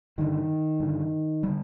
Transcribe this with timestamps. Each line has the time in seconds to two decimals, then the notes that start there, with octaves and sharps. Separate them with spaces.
0.18 G2 D3 D#3
0.80 G2 D3
1.43 D3 G3